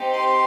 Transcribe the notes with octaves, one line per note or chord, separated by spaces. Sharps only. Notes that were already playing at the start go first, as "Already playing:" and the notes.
Already playing: C4 D#4 G4
C6